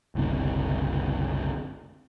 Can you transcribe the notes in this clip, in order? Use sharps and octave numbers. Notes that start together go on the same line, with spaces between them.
F#1 C2 D3 C4